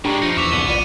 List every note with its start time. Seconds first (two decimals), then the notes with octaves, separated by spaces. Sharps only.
0.05 A2 G#3 D4 G4 A#5 C#6
0.22 F3 D#4 F4 C#7
0.37 E2 B4 E5 C#6 D6 F7
0.52 C2 B3 D6 D#7 G7
0.68 A#1 F4 D5 D#7